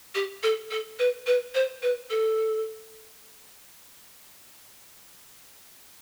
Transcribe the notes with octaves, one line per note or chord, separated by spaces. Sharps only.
G4
A4
A4
B4
B4
C5
B4
A4